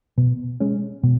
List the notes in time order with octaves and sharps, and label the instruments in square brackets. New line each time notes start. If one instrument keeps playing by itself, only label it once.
[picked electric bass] B2
G#3 C#4
B2